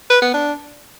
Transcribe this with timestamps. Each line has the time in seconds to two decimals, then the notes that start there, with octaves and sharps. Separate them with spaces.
0.10 B4
0.22 B3
0.34 D4